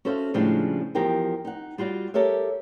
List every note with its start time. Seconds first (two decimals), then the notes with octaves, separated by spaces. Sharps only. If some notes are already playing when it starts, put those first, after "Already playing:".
0.05 C#4 F#4 A4 C5 E5 F5
0.34 A2 C#3 F3 G3 G#3 D4
0.95 E2 F3 G4 A#4 G5
1.45 D#4 F#5
1.78 G3 F4 F#4 D5
2.14 G4 A4 A#4 C#5 E5